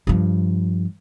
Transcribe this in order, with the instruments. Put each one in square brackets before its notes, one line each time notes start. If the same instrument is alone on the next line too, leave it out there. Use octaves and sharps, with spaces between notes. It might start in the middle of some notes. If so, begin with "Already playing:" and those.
[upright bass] G2 F3